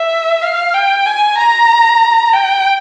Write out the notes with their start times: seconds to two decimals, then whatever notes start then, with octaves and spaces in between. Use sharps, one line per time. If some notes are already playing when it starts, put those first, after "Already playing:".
Already playing: E5
0.42 F5
0.74 G5
1.06 G#5
1.38 A#5
2.33 G5